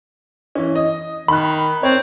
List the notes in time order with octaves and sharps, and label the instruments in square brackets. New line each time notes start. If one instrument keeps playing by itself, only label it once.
[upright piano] E3 C#4
D#5
[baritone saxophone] D#3 [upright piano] B5 F#6
[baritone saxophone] C4 [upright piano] C#5